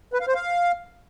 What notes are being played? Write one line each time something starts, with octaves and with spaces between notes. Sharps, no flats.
B4
F5
C5
F5